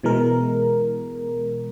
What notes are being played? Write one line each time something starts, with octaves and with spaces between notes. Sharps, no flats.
B2 E3 G#3 A#4